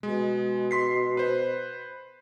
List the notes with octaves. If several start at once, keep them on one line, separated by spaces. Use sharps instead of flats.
B2 G#3
C6 B6 C7
B4 C5